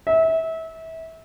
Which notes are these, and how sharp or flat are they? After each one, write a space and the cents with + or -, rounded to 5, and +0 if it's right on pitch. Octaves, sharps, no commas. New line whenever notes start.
E5 -25